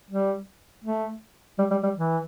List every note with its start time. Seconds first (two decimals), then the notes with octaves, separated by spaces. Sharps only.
0.10 G3
0.84 A3
1.58 G3
1.71 G3
1.83 G3
1.95 E3